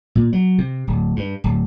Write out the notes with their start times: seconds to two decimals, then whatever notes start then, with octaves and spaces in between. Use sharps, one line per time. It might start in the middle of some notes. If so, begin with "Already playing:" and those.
0.15 A#2
0.33 F#3
0.58 C3
0.87 D1
1.16 G2
1.44 D1